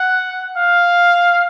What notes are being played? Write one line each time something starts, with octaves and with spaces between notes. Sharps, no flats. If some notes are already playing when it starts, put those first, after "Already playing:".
Already playing: F#5
F5